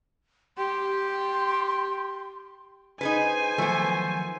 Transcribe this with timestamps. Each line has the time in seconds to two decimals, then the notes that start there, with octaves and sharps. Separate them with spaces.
0.58 G4 C6
3.01 D#4 G#4 B4 C5 G#5
3.58 D#3 F3 F#3 A3 B3